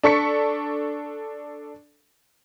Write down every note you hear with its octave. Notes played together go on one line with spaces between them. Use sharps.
D4 A4 C#6 B6 C#7